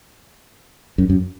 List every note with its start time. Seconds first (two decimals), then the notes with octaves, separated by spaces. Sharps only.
0.98 F#2
1.10 F#2